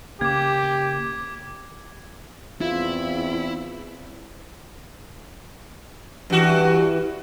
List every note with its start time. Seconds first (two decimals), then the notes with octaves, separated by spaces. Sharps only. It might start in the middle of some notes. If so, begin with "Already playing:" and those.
0.21 C#3 A#3 G4 D6 G#6
2.61 E2 C4 E4 F4
6.30 G2 E3 F#4